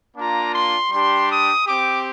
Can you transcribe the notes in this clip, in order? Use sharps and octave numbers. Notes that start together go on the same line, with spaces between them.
A#3 D4 F4 A#5
C6
G3 D4 G4 C6
D#6
C4 G4 D6